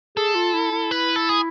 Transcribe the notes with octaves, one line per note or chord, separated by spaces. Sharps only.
G#4 A4
F4
E4
E4
B4
A4
G#4